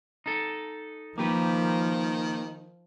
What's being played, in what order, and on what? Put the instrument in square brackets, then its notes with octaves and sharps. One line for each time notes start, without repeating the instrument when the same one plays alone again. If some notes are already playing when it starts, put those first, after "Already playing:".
[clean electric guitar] D#4 A4
[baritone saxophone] D#3 [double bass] F3 [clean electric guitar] A#3 G4 B4